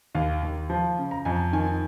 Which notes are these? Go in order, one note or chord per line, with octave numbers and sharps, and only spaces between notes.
D#2 F5
D#2
F3
C#3
A#5
F2 G#5
D#3 G#5